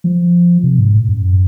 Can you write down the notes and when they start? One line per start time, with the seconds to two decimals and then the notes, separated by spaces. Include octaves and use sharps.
0.04 F3
0.63 C3
0.79 G#2
0.93 A2
1.08 F#2